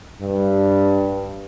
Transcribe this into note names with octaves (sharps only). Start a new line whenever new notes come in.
G2